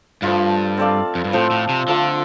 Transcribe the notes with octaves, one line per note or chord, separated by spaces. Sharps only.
G2 F3 A3 F4
C4 A4 D5 F5
F2
G2
A2 F3 C4 A4 C5
A2
C3
D3 A3 F4 A4 C5